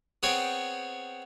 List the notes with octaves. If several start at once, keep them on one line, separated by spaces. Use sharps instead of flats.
B3 C4 G#4 C#5 G5